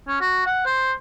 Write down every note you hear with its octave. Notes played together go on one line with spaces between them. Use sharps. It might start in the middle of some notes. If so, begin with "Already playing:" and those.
C#4
F#4
F#5
C5